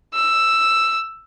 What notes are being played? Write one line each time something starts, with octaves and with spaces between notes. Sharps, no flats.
E6